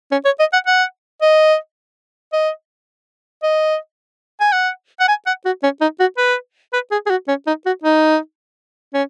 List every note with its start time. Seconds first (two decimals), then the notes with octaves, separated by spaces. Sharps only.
0.11 C#4
0.25 C#5
0.39 D#5
0.53 F#5
0.67 F#5
1.21 D#5
2.33 D#5
3.43 D#5
4.40 G#5
4.52 F#5
5.00 F#5
5.08 G#5
5.26 F#5
5.45 F#4
5.63 C#4
5.81 D#4
6.00 F#4
6.18 B4
6.73 B4
6.91 G#4
7.06 G#4
7.10 F#4
7.28 C#4
7.47 D#4
7.66 F#4
7.83 D#4
8.94 C#4